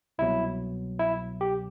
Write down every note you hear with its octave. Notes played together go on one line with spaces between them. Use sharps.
C2 B2 F#3 E4
E4
G4